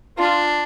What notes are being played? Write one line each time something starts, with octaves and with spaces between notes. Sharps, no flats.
D4 F4